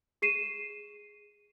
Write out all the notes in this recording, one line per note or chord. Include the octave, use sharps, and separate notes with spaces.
G#4 C7 D#7 E7